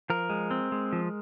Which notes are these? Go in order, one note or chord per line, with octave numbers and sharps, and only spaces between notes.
F3 A#4
G#3
C4
G#3
F3